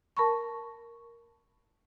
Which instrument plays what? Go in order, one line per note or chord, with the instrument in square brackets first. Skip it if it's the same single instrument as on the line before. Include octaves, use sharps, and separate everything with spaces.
[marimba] A#4 A5 B5 C#6